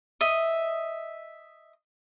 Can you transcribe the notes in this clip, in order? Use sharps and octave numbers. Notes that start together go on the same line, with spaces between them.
D#5 E5